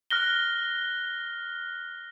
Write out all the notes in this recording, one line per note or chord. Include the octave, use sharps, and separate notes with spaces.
F6 F#6 A#6 G7